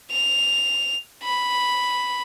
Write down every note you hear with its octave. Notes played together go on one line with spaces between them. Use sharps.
F7
B5